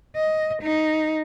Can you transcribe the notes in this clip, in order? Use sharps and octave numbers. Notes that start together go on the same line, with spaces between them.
D#5
D#4